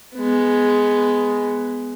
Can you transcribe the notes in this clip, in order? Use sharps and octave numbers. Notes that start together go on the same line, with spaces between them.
G#3 B3